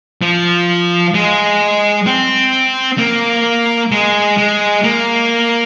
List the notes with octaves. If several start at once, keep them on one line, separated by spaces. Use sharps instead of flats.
F3
G#3
C4
A#3
G#3
G#3
A#3